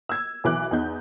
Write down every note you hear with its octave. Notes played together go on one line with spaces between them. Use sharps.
E6 G#6
B1 E3 D6 F#6
E2 D#4 G6